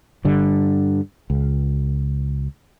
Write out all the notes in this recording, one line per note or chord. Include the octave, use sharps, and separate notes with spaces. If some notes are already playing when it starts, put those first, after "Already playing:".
G2 D3 G3
C#2